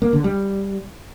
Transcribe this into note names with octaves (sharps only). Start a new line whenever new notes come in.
A#3
D3
G3